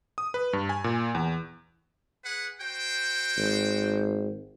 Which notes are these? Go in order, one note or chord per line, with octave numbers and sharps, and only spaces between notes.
D#6
B4
G2
G#5
A#2
E2
G#4 B4 F#5
F#4 C5 G5
G#1